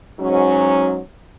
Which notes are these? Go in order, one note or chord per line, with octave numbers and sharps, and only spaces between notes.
G#2 F#3 C#4